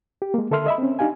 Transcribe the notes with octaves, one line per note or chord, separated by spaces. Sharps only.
G4
G#3 A#3
D3 A4 A#4 E5 C6 F6
D#5 E5 B5
C4 C#4
D4 D#4 G4 F5 G#5